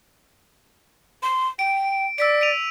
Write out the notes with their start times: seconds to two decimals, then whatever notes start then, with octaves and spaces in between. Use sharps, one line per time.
1.23 C6
1.59 G5 D7
2.18 D5 E6 B6 D7
2.41 D7 D#7 F7